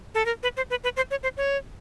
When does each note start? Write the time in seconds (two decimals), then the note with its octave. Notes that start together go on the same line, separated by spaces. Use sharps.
0.15 A4
0.25 A#4
0.43 B4
0.57 C5
0.70 B4
0.84 B4
0.97 C5
1.11 C#5
1.23 C5
1.37 C#5